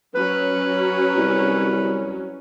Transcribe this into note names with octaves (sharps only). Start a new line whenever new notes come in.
F#3 C#4 B4
C2